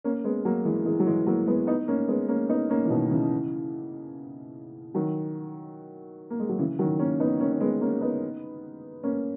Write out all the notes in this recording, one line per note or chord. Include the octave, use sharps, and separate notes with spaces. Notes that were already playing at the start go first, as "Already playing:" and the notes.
A#3 C#4
G#3 B3
F#3 A#3
E3 G#3
E3 G#3
F#3
E3 G#3
F#3 A#3
G#3 B3
B3 D#4
A#3 C#4
G#3 B3
A#3 C#4
B3 D#4
A#3 C#4
E3
B2 D#3
C#3 E3
D#3 F#3
A#3
G#3
F#3
C#3 E3
D#3 F#3
A#3 C#4
B3 D#4
A#3 C#4
C#4
G#3 B3
A#3 C#4
B3 D#4
A#3 C#4